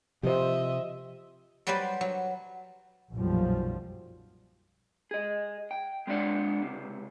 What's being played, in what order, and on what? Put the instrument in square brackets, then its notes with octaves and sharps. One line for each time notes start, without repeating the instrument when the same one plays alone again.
[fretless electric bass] C3 F3 [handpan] G4 C5 [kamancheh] D#5 E5
[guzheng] F#3 G3 G4 B4 C5 D5
F#3
[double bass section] B1 F#2 A#2 F3 G3
[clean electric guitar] G#4 D#5
G5
G#3 C4 D4 E4 D5 F#5
C#2 C3